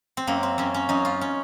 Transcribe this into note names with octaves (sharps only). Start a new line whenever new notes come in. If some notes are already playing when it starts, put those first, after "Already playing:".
C4
F#2 A#3
C4
F#2 C#4
C#4
F#2 D#4
F4
C#4